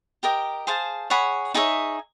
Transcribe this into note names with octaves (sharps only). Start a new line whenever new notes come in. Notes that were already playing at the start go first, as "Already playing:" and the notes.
G4 A#4 D#5 G5
G#4 C5 F5 A5
G#4 C#5 F#5 B5
D#4 G#4 C#5 E5